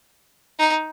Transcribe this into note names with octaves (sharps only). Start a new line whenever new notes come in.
D#4